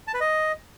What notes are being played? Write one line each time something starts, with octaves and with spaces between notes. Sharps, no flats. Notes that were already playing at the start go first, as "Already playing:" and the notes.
A5
B4
D#5